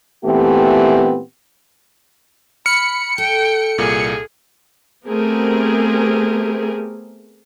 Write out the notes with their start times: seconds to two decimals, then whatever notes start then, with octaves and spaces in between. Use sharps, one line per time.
0.25 A#2 E3 A3 B3 C4 G4
2.66 B5 F6 C#7
3.18 A4 G5
3.78 C2 A#2 A#3 G#4
5.08 A3 B3 C4 G4 G#4 A#4